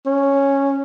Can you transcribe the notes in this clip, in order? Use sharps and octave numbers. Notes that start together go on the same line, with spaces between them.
C#4